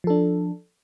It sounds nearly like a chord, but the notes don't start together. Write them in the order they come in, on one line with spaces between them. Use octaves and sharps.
F3 A4 D4